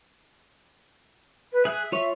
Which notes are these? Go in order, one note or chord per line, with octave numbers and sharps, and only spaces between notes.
B4
G#4 E5 F#6
F4 C#5 C#6